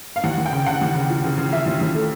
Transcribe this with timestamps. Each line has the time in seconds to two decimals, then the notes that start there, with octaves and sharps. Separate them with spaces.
0.16 F5
0.24 D#2 F#5
0.38 D#2
0.46 G5
0.53 C#3
0.66 C#3 F#5
0.81 D#2
0.95 C#3
1.10 F3
1.24 C#3
1.38 C#3
1.52 F3 E5
1.66 D#2
1.81 D#2
1.95 A3